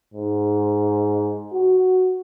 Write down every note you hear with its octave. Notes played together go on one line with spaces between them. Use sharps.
G#2
F#4